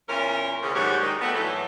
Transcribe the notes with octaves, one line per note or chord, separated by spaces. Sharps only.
E2 A#2 E3 C#4 A#4
D2 C#3
D#2 G#2 F#3 G3 F#4 G4
D#3
G3 A3 B3 F#4 B4 D#5
A2 E3 F#3 A4